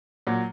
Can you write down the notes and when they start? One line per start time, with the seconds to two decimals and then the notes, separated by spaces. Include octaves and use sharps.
0.27 A#2 F#3